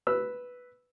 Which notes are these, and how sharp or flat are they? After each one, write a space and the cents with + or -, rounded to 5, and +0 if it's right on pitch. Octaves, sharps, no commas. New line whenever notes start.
B4 +0 E6 -5